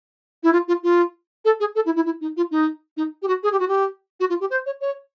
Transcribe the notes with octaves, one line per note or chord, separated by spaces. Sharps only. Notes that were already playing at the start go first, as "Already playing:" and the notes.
E4
F4
F4
F4
A4
G#4
A4
E4
E4
E4
D#4
F4
D#4
D#4
G4
F#4
G#4
G4
F#4
G4
F#4
F4
G4
C5
C#5
C#5